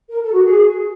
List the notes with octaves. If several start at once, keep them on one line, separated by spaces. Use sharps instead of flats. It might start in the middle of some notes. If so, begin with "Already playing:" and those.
A#4
A4
F#4
G#4